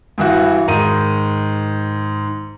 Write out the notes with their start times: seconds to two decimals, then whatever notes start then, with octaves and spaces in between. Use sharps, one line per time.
0.18 G2 E3 F#4
0.68 G#2 D#3 D#7